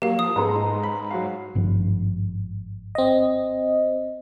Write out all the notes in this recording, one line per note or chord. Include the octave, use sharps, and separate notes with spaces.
F#3 A#3 G4 F5
F3 D#6
G#2 G#3 B3 A4 B4 A#5 C6
D#4
B5
F#3 F#4 F5
G#1 G2 F3
C4 D#5